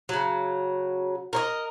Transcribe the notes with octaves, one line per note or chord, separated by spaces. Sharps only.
C#3 F#3
A#4 C#5 D#5